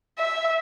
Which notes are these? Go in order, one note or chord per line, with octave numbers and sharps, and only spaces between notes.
E5